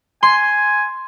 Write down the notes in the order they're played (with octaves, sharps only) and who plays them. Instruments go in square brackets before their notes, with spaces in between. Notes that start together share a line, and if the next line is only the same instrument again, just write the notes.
[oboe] G#5 [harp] C6